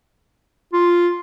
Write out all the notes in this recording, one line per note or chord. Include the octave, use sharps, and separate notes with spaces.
F4